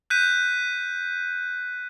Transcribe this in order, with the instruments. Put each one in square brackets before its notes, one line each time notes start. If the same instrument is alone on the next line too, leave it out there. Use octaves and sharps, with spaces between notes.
[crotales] F#6 G6 B6 D#7